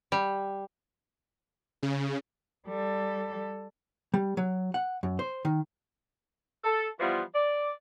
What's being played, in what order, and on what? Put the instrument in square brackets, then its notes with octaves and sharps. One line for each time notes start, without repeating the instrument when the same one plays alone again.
[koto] G3
[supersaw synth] C#3
[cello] G3 A4
[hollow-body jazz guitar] G3
F#3
F#5
F#2
C5
D#3
[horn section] A4
E3 F3 G3 B3 F4
D5